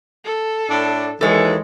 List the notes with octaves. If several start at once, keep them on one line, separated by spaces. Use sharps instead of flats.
A4
A2 D4
D#2 E3 G#3 A4 C#5